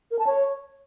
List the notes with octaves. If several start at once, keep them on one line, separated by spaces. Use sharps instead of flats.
A#4
A5
C#5